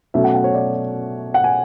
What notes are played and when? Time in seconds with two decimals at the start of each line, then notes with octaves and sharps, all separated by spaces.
0.14 B2 F#3 A3 C#4 E5
0.24 F#5
0.34 F#5
0.44 C#5
0.55 D5
1.34 F#5
1.44 G#5